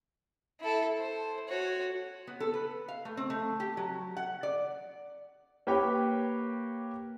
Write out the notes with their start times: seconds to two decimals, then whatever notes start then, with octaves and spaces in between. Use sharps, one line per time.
0.60 E4 A4
0.99 C5
1.48 F#4 C#5
2.27 B3
2.40 A4
2.54 B4
2.88 F5
3.05 A3
3.17 C4
3.30 A3
3.60 G4
3.77 F#3
4.17 F#5
4.43 D5
5.67 A#3 G4 B4 C#5 G5